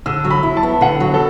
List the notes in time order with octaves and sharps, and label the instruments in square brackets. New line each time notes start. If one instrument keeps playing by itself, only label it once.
[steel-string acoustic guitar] D3 [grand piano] E6
[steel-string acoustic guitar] F#3
[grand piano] B5
[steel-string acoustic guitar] E4
[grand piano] A5
[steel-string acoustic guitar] B3
[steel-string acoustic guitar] D3 [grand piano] F#5
[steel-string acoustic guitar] F#3
[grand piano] A4